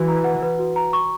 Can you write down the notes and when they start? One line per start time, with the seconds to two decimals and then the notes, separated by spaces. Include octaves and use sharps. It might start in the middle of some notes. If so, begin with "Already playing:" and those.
Already playing: E3 F#4 B4
0.08 A#5
0.24 F#5
0.42 B4
0.59 F#4
0.76 A#5
0.93 C#6